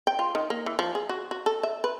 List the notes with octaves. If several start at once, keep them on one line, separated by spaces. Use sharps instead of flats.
G5
F4
D#3
A#3
E3
F3
G#4
F#4
F#4
A4
E5
B4